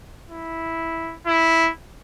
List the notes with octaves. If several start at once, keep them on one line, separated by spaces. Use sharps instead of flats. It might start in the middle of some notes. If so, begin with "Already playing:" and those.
E4
E4